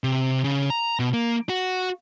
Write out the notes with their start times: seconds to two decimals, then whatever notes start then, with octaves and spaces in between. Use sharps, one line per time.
0.04 C3
0.44 C#3
0.70 A#5
0.99 B2
1.13 A#3
1.49 F#4